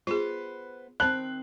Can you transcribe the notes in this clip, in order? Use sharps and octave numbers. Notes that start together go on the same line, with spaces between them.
B3 F4 G#4 B4 C5
D#3 C4 C5 A5 B5 F#6